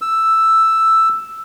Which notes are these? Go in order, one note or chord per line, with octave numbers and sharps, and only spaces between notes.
E6